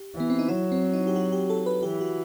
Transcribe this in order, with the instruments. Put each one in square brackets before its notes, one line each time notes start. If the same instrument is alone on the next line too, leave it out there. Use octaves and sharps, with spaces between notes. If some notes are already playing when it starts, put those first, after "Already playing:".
Already playing: [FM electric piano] G4
[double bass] E3 [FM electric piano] B3
[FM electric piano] C4
D#4
[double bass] F#3 [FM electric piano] E4
[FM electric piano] C4
D#4
G4
F#4
G4
A4
B4
[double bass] E3 [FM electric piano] G4
[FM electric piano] F#4